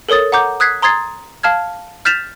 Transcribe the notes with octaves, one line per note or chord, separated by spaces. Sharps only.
A4 A#4 C#5 D#6 A6
F#5 A#5 D6 G6
D#6 F#6 G#6 B6 C7
A#5 C6 D#6 G#6 A6 C7
F5 A5 F6 G#6
F6 G6 A6 B6 E7 F7